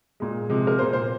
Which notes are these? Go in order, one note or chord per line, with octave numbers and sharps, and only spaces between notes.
A#2 G#3
C3 F3 G#3
A#4
A#2 G#3 C5
C5